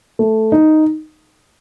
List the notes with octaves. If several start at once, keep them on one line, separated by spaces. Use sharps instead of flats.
A3
D#4